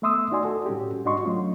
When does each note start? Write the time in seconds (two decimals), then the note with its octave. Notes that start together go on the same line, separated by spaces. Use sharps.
0.02 A3 B3 E5 C6 D#6 E6
0.32 D#4 F#4 D5 G#5 C6
0.45 F#4 A4
0.66 A2 G3 C#4 F#4 G4
1.05 G#2 D4 F#4 D#5 C6 C#6
1.23 F#3 A3 C#4 F4